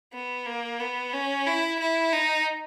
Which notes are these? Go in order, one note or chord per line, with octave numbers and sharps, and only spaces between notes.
B3
A#3
B3
C#4
E4
E4
D#4